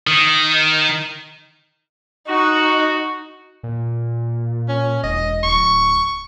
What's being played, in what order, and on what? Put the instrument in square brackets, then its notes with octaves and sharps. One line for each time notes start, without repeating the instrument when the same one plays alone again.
[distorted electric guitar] D#3
[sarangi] D#4 [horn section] F#4
[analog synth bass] A#2
[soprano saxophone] C#4
[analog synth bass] E1 [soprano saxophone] D#5
[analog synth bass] D1 [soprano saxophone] C#6